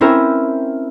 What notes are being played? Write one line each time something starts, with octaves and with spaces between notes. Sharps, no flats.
C4 C#4 E4 A#4